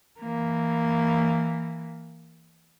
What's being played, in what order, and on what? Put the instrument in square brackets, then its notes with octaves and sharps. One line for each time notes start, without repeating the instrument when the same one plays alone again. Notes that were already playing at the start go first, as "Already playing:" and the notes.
[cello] E3 A#3